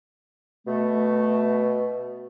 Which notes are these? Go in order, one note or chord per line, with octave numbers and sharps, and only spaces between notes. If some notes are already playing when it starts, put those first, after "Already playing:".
B2 A3